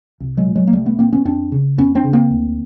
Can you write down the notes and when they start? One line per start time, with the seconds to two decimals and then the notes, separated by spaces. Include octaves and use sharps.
0.20 C2
0.37 F#3 G#3
0.46 A#2
0.56 F#3 G#3
0.67 A#3
0.73 C2 G3 A3
0.86 A3 B3
0.99 A#2 A#3 C4
1.13 B3 C#4
1.25 F2 C4 D4
1.52 C#3
1.78 F2 B3 C#4
1.95 C4 D4
2.04 C#3
2.13 A#3 C4
2.31 D2